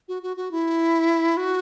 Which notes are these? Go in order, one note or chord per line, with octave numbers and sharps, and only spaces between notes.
F#4
F#4
F#4
E4
F#4